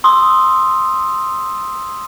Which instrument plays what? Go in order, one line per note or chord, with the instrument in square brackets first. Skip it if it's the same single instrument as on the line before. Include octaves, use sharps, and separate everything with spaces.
[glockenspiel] C6 D#6 E6